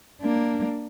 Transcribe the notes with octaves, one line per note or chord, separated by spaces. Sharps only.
A#3 D4